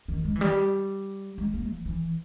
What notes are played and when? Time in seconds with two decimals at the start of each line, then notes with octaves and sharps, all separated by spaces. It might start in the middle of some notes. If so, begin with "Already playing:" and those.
0.08 D#3
0.25 G#3
0.36 E3
0.41 G3
1.38 G#3
1.54 A#3
1.70 E3
1.86 E3